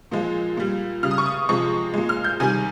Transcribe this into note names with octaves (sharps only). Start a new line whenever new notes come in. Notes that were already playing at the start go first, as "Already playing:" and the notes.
A#2 F3 G#3
A#2 G3
C#3 G3 F6
D#6
C#6
D#6
C3 F3 G#3 C#6
A#2 G#3
F6
G6
C3 D#3 G3 G#5